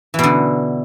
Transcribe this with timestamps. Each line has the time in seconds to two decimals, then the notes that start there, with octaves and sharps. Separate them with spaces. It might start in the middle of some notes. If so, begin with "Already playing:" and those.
0.14 E3
0.19 B2
0.23 D3